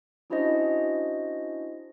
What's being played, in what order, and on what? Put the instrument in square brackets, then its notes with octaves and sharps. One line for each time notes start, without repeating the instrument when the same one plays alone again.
[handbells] C#4 D4 E4 F#4 C5 D#5